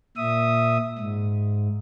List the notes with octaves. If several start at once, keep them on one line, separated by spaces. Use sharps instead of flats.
A#2 E5 D#6
G#2